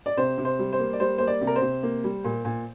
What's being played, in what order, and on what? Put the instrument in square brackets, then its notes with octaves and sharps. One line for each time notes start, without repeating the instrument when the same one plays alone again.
[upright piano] D5
C3 C5
C3
C5
G3
C5
A#3
D5
G3 C5
A#3 C5
D5
C3
A#4
C5
C3
A#3
G3
A#2
A#2